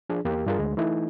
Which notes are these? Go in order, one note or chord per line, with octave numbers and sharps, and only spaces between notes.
F3 D4 G#4
E2 A#3 G4
G2 D4 F4 G#4 A#4
D2 G#3
E3 A3 D#4 E4